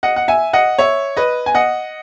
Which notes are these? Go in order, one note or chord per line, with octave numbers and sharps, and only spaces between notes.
D#5 F#5
F#5
E5 G#5
D#5 F#5
C#5 E5
B4 D#5
G#5
D#5 F#5